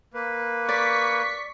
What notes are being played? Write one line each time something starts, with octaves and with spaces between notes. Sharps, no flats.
A#3 B4
D5 C#6 B6